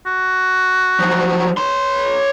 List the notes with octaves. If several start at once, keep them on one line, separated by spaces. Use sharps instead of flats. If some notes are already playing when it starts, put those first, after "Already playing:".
F#4
F3 F#3
C#5 C6